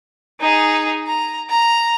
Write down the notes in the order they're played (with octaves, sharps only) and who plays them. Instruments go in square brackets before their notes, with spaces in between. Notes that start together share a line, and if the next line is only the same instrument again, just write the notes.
[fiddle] D#4 G#4
A#5
A#5